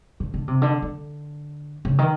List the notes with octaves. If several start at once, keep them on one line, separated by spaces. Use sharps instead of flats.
D3
D3
C3
D3
D3
C#3
D#3